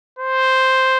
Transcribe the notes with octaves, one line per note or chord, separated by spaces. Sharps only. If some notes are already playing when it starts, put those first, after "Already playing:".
C5